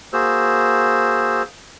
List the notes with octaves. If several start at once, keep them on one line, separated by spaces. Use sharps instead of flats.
A#3 F#4 G#4 C5 E6